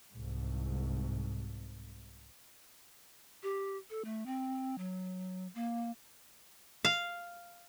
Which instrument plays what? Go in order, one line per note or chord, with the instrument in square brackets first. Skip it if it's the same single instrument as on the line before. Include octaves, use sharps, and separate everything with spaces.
[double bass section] C2 G#2
[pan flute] G4
A4
A3
C4
F#3
A#3
[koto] F5